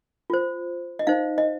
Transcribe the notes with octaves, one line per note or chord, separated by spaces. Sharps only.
F4 C5
D#5
D#4 C5 F5
D#5